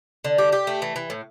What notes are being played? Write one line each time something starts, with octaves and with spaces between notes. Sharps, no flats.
D3
G4
G4
A3
E3
E3
A2